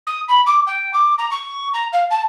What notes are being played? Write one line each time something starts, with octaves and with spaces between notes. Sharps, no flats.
D#6
B5
D6
G5
D6
A#5
C#6
A#5
F5
A5